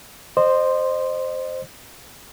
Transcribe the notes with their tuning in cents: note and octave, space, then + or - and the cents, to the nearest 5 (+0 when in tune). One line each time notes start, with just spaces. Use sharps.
C5 +0 D#5 -30 C6 +0